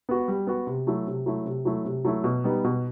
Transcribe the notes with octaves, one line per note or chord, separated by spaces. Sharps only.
B3 F#4
G3
B3 F#4
C3
F#3 A3 E4
C3
F#3 A3 E4
C3
F#3 A3 E4
C3
F#3 A3 E4
B2
G3 B3 D#4
B2